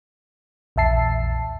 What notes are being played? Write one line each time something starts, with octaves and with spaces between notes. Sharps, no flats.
A#1 E2 E5 A5 C7